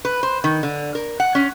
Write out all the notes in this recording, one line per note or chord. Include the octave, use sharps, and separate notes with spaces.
B4
C5
D#3
D3
A#4
F#5
C#4